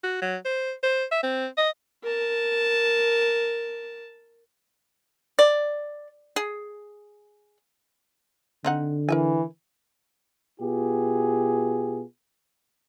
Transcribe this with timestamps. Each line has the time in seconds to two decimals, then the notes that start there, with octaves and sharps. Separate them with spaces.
0.03 F#4
0.22 F#3
0.45 C5
0.83 C5
1.11 E5
1.23 C4
1.57 D#5
2.03 A#4 A5
5.39 D5
6.36 G#4
8.65 D3 C4 D#4 F#5
9.09 E3 A#4 E5 G#5
10.59 B2 B3 F4 G4 G#4